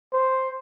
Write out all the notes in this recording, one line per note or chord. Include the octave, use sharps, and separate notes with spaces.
C5